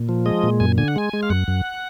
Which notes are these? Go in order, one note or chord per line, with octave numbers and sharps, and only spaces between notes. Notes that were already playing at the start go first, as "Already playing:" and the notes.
Already playing: A#2
F3
G#3 D#5
A#2
F#2 G#5
D3 G#5
F#5
G#3 G#5
G#3
F5
F#2 F#5
F#2